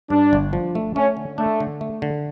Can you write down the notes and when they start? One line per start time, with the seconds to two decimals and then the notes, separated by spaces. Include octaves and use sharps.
0.10 G2 D4
0.33 G1
0.53 F3
0.75 A3
0.96 A3 C#4
1.17 D3
1.38 A3 D4
1.60 D3
1.81 A3
2.02 D3